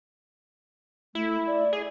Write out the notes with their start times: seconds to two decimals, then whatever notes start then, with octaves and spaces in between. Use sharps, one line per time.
1.15 A3 E4
1.47 D5
1.73 G#4